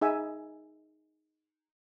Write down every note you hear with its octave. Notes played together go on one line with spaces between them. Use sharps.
D#4 G#4 E5 G#5